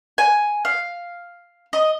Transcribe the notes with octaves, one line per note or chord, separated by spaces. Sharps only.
G#5
F5
D#5